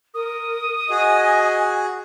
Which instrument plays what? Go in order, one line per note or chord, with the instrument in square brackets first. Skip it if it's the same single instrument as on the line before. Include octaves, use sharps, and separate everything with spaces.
[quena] A#4 [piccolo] D#6
[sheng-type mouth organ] F#4 G#4 [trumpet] D#5 [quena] G#5